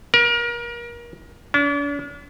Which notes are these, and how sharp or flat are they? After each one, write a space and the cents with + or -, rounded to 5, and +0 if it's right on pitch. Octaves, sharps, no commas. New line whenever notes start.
A#4 +30
D4 -45